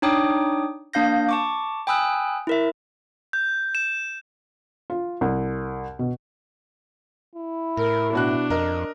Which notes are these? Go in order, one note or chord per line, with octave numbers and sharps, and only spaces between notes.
D4 D#4 C#5 G5 D6 D#6
A#3 D4 F5 G6 A#6
A5 C#6 D6
G5 G#5 B5 D#6 E6 F#6
E4 A#4 E5
G6
E7
F4
C2
B2
E4
A2 A#4
B2 D4 F#4 F#6
F2 A#4 D#5